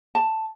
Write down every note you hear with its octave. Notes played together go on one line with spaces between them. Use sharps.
A5